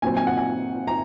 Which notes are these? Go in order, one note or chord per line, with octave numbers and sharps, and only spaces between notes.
A#2 F#3 C4 G#5
G#5
F#5
G#5
A#5